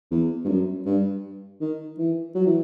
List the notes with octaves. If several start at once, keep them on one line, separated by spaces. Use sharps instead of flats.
E2
G2
F#2
G2
D#3
E3
F#3
E3